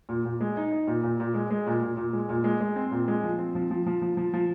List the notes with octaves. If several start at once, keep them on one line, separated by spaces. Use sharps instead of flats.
A#2
A#2
G#3
D#4
D#4
A#2
A#2
A#2
G#3
G#3
A#2
A#2
A#2
G#3
A#2
G#3
G#3
C4
A#2
G#3
F3
C4
F3
F3
F3
F3
F3
F3